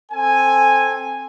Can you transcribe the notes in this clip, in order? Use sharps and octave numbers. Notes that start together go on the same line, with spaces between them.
C4 A4 G#5